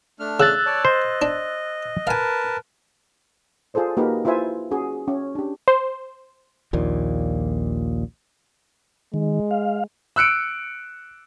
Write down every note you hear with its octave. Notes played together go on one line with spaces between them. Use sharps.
A3 D4 F6
C#3 E6 F#6 A6
C#5 D5 A5
C5 D#5
D4
A#4 B4 F5 G#5 A5
F4 G#4 A4 C5 D5
A#3 D#4 F#4 G4 A#4 B4
E4 F4 B4 C5 E5 G#5
C#4 F#4 G#4
C#4
D4 G4
C5
A#1 D#2 A#2
D#3 G#3
F5
E6 F#6 C#7 D7